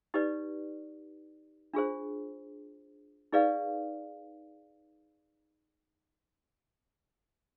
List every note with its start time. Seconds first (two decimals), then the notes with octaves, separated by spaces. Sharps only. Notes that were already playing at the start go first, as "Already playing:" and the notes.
0.14 D#4 G4 B4 D5
1.74 D4 F4 G#4 C5
3.33 D#4 G#4 B4 D5 F5